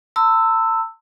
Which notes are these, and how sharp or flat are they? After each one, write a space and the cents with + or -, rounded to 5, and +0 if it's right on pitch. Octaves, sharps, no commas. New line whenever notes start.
A5 +40 C6 -45 E6 +0